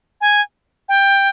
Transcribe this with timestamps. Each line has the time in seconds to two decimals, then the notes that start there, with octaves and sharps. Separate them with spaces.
0.21 G#5
0.89 G5